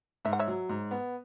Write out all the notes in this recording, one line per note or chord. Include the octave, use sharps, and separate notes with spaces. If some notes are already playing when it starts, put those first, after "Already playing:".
G#2 E5
F#5
C#5 E5
F#3
G#2
B3